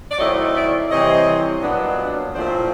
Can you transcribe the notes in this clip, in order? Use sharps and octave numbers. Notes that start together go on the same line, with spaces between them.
D5
D#3 F#3 A3 C4 E4 C#5 D#5
D5 E5
C3 E3 G3 C4 C#5 D#5
A#2 F#3 B3 D4
A#2 F3 A3 C4 E4 C5 D5